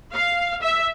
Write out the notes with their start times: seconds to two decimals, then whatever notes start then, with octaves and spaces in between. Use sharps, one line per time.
0.13 F5
0.61 E5